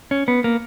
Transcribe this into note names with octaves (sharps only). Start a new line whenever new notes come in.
C#4
B3
A#3